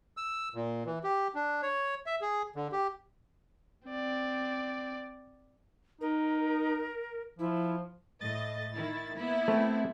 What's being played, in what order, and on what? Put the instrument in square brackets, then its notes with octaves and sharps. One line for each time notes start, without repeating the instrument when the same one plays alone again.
[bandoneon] E6
A#2
E3
G4
D4
C#5
E5
G#4
D3
G4
[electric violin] C4 D5
[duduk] D#4 [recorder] A#4
[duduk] F3 [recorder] E4
[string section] A2 D#5 [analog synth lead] A6
[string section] D#3 E4
A#3 B3 E4
[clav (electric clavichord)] A3 [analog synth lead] C4